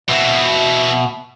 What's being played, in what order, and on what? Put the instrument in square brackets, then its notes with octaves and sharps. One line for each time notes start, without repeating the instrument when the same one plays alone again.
[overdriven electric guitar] B2 [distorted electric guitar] E3 C4 [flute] E5